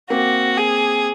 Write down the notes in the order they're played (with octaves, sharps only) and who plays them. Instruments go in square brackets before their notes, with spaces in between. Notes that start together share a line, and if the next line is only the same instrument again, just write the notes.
[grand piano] A#3 C4 [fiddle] F#4
[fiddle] G#4